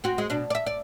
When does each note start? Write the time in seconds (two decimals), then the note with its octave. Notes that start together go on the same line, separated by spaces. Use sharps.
0.04 C4 F#4
0.18 G#3
0.30 B2 D4
0.50 D5 E5
0.66 D5